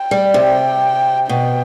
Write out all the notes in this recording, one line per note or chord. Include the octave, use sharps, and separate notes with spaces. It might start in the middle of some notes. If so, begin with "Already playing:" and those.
Already playing: G5
G3
C3 G5
B2 G5